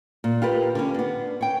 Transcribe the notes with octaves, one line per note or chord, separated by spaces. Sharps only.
A#2
F4 G4 A#4 B4
D3 C#4
B3 D4
C#5 G5